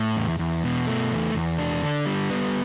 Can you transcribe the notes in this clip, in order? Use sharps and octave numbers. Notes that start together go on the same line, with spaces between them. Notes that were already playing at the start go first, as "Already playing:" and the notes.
Already playing: A2
E2
E2
B2
A3
E2
E2
D4
D3
G3
B3